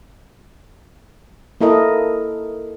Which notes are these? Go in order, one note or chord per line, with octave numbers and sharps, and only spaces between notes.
A#3 E4 A4 A#4 D#5